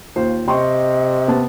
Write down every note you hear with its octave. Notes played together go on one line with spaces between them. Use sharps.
D#2 F4 C5
C3 D#5 G5 C6 C#6
B3 A5